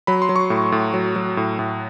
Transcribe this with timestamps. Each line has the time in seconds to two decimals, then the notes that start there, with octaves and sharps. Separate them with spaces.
0.07 F#3 B5
0.22 C6
0.29 F#3
0.36 C#6
0.50 A2
0.72 A2
0.94 F#3
1.16 F#3
1.37 A2
1.59 A2